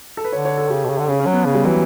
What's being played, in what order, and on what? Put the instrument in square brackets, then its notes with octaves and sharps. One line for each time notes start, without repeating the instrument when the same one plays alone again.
[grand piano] A4
B4
[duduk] D3 [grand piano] C#5
[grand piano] C#5
A4
[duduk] C#3 [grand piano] G4
[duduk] B2
C#3
D3
[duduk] C#3 [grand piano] C#4
[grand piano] C#4
[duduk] F#3
[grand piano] B3
[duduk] C#3
[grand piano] G3
[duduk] E3 [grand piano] F#3